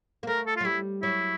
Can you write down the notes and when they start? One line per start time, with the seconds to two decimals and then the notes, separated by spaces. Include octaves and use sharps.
0.23 A#3
0.27 A3 A#4
0.46 A4
0.56 F4
0.60 F#3
0.65 G3 E4
1.02 F#3 E4